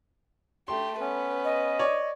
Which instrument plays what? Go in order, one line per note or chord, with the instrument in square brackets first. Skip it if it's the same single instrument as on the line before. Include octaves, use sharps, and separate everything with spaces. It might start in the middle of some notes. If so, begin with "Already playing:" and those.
[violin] A3 G4 [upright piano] C6
[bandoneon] B3 C#4 [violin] B4
[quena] D#5
[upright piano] C#5 D5